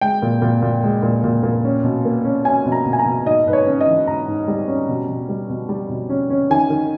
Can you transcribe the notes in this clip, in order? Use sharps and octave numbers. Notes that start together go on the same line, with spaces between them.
G#3 G5
A#2
A#2
A#2
G#3
A#2
A#2
A#2
C#4
B2
A#3
C#4
C#4 G#5
B2
A#5
B2
G#5
A#5
B2
G#2 D#5
G#2 B4
C#5
C#4
D#5
E3
G#2 A#5
G#2
G3
C#4
B2
B2
G3
B2
G3
B2
C#4
C#4
D#3 G#5
D#3